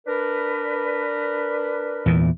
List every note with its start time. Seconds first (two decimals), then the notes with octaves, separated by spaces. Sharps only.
0.06 D4 A#4 B4
2.06 E2 A#2 E3